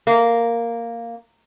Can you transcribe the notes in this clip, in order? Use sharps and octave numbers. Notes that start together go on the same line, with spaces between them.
A#3